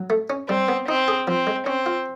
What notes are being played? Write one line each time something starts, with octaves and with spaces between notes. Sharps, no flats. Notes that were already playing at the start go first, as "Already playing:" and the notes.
Already playing: F#3
A3
C#4
G3 C4
B3
C4 D#4
G#4
F3 C4
G#3
C4 C#4
F4